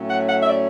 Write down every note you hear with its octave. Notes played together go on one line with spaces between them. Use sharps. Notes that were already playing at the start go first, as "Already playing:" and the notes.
Already playing: A2 F#3 A3 C#4
F#5
F#5
E5
D5